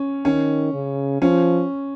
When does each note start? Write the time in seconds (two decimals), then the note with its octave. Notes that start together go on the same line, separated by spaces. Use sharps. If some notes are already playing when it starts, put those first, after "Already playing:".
Already playing: C#4
0.25 D#3 C#4
0.74 C#3
1.22 F3 C#4